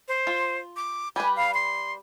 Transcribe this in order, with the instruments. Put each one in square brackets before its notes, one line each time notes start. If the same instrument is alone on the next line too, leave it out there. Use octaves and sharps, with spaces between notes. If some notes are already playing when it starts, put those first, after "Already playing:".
[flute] C5
[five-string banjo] F4
[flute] D6
[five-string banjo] G3 B4 [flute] G#5
[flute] F5
C6